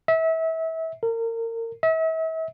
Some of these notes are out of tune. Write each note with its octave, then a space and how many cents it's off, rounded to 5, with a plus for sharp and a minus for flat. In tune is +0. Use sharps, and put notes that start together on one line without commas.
E5 -30
A#4 -30
E5 -40